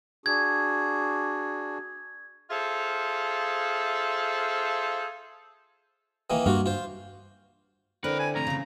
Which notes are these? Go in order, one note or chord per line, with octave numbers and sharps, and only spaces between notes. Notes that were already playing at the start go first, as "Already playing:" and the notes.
D4 F#4 G#4 G#6
F4 G#4 A4 C5 E5 F5
D#3 E3 A#3
G2 A#3 F4 F#4
F4 C5
D3 C4 E4 A#4 B4
G#5
F2 A2 C3 A#5
C#3 E3